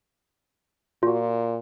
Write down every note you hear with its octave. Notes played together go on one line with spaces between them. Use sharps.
A#2 F4 F#4